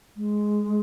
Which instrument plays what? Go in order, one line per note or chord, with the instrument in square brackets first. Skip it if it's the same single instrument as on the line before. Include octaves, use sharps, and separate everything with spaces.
[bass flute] G#3